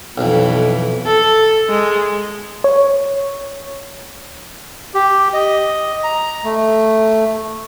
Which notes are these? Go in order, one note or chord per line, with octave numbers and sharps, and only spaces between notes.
B1 F2 B2 E3
A4
G#3
C#5
G4
D#5
A#5
A3